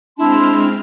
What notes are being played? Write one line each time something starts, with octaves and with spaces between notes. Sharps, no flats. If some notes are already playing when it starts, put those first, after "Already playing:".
G#3 C4 D4 E4 A5 C6 F6